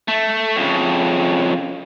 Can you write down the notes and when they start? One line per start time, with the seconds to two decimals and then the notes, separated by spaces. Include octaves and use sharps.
0.08 A3
0.56 F2 C#3